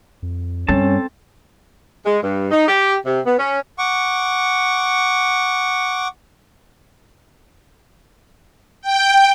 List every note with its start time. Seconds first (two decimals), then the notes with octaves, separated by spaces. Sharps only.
0.22 F2
0.68 G2 G3 C4 C#4 A4 A5
2.05 G#3
2.22 G2
2.50 D#4
2.67 G4
3.05 C3
3.25 B3
3.38 C#4
3.78 F#5 C#6 D6
8.81 G5